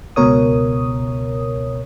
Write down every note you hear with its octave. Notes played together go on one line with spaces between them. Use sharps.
C#2 B2 A#4 C#5 D#6